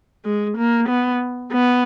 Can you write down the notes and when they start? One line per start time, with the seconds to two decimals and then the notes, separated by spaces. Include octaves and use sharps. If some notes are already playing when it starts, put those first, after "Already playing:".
0.25 G#3
0.58 A#3
0.89 B3
1.53 B3